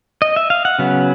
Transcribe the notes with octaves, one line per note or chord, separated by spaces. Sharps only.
D#5
E5
F5
F#5
C#3 F#3 B3